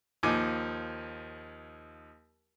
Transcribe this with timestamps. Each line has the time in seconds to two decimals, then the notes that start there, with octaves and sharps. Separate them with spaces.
0.23 D#2 F3 D#4 G#5 D6